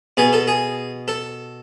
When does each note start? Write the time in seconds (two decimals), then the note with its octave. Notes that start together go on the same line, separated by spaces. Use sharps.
0.17 B2 G#4
0.33 A4
0.48 G#4
1.08 A4